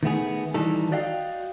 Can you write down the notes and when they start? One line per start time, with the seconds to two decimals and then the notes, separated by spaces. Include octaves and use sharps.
0.03 D#3 A3 B3 G#4
0.54 D#3 E3 G3 D#4 A4
0.92 F#4 D5 D#5 F5 G5